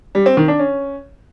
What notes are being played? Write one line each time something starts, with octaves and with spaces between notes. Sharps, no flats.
G3
C4
D#3
D4
C#4